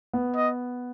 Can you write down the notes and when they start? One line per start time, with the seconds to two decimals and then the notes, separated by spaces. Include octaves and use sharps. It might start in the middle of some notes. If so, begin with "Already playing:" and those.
0.13 B3
0.36 D#5